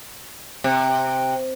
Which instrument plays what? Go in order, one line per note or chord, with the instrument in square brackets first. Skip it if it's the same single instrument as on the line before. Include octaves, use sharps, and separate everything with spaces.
[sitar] C3